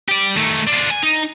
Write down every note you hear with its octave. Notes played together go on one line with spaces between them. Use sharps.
G4 D5
D#3 A3
D4 F4
G#5
D#4